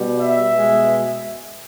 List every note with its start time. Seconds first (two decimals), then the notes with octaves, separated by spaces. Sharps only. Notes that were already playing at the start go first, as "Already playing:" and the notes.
Already playing: B2 G3
0.19 E5
0.51 B2 G#3